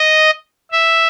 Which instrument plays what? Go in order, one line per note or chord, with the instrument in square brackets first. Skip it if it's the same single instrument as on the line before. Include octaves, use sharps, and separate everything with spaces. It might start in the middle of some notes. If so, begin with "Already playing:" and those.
Already playing: [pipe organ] D#5
E5